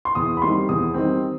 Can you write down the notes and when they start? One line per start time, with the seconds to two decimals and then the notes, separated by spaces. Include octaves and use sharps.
0.05 C6
0.15 E2 D#6
0.37 B5
0.42 D#3 G3 C4 C6
0.69 E2 D#6
0.94 D#3 G3 C4